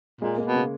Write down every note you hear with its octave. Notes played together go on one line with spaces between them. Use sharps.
A#2 G#3
A#3
B2
C#3